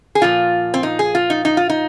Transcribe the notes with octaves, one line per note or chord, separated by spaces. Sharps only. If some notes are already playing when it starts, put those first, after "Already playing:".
G#4
A#2 F3 F4
C4
D#4
G#4
F4
D#4
D#4
F4
D#4